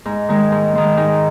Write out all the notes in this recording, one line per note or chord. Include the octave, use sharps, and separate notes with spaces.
G#2
D#3 G#3
G#2
D#3 G#3
G#2